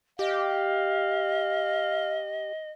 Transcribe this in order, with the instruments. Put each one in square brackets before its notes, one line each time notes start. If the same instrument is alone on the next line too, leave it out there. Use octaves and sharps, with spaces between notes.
[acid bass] G4 [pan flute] D#5 [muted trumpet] F5